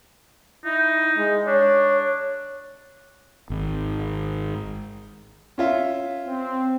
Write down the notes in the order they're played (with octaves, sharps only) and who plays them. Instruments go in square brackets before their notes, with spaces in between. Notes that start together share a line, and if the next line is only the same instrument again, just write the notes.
[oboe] D#4 [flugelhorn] E4
[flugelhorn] G#3
[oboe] D4 [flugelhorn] C#5
[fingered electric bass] G#1
[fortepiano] C#4 F4 E5
[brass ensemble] C4